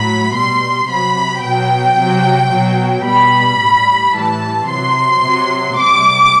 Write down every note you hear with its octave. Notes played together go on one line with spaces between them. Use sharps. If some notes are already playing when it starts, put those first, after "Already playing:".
Already playing: A2 F#3 B5
B2 G3 C6
C3 F#3 B5
B2 F#3 G5
C3 F#3
B2 F#3
B2 G3 B5
A2 G3
A2 E3 G3 A5
C3 F#3 C6
C3 F#3
C3 G3 D6